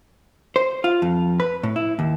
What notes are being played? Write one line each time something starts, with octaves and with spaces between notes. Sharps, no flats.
C5
F4
F2
B4
A2
E4
D#2